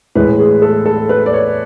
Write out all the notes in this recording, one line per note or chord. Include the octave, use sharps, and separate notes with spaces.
A2 E3 G#3 B4
G#4
A4
A4
B4
D5
C#5